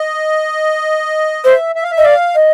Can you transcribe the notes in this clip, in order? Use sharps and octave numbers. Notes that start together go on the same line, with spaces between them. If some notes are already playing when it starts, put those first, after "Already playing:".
Already playing: D#5
C5 E5
E5
F5
E5
D#5
D5 F5
D#5